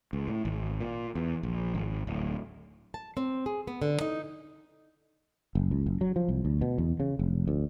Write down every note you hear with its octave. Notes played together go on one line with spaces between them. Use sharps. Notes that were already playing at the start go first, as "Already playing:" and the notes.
C#2
A2
G#1
A#2
E2
A#1
G#1
D1
A5
C4
G#4
B3
D3
D#4
F#1
C#2
F#1
F#3
F3
C2
D2
B2
E2
C#3
F1
D2